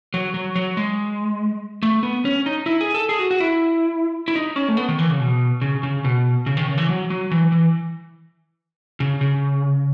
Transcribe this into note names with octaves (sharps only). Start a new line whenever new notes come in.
F#3
F#3
F#3
G#3
A3
B3
C#4
D#4
E4
G#4
A4
G#4
F#4
F#4
E4
E4
D#4
C#4
A3
B3
D#3
E3
C#3
B2
C#3
C#3
B2
C#3
D#3
C#3
E3
F#3
F#3
E3
E3
C#3
C#3